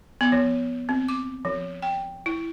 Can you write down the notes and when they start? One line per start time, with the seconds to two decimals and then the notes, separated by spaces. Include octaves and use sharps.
0.21 B3
0.32 F3
0.89 C4
1.09 D6
1.45 F3
1.82 G5
2.26 E4